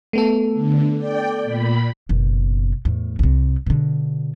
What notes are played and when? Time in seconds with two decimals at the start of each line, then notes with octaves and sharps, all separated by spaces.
0.13 A3 B3 A4
0.53 D3
0.96 D5 G5
1.44 A#2 B5
2.09 F#1 B2
2.85 E2 A2
3.19 C2 C3
3.66 B2 D3